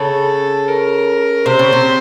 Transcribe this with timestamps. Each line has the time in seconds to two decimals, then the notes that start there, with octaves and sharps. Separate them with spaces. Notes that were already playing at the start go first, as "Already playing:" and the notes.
Already playing: C#3 A4
0.68 A#4
1.46 C3 C5
1.59 C#3
1.73 C3